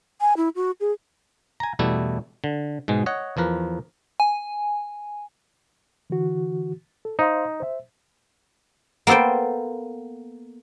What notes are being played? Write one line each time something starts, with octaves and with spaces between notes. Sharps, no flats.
G#5
E4
F#4
G#4
G#5 A#5
E2 B2 G3 A3 E4
D3
G#2 B2 G#3
C#5 D#5 F#5
E2 F3 A#4 B4
G#5
D3 E3 F#4
A4
D#4 C5 F5 C6
C5 E5
A#3 B3 A4 C5 G5